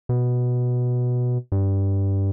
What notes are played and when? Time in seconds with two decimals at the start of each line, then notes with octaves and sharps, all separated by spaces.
0.09 B2
1.52 G2